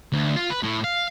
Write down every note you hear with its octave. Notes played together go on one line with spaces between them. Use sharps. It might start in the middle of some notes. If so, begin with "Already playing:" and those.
D2
F4
B4
A2
F5